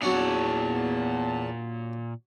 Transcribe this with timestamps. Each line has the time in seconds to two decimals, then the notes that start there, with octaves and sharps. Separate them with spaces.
0.02 E2 A#2 F#3 B3 C#4 D4 F#5 A5